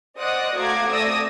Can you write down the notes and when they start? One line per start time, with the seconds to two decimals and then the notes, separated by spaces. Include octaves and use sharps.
0.18 C5 D5 D#5 F#5 D#6 F#6
0.56 A3 F#4 F5 A#5 D6 G#6
0.88 A3 C4 D5 D#6 E6 A#6